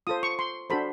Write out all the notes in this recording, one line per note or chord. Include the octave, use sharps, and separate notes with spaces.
F4 A4 C5 D#6
C#6
C6
D4 F#4 A4 C5 B5